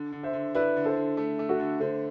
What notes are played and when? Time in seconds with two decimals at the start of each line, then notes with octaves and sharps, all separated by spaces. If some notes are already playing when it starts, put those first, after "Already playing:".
Already playing: D3
0.12 D3
0.23 C5 E5
0.33 D3
0.55 E4 B4 D5
0.76 D3
0.86 A4 C5
0.96 D3
1.17 A3
1.39 A3
1.49 F#4 A4
1.60 D3
1.80 D3 A4 C5